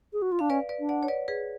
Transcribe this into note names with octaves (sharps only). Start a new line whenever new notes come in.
G#4
F#4
F4
D4 F5
C#4 B4 D5
B4 D5
D4
D5 F#5
C#5
B4 D5
G#4 B4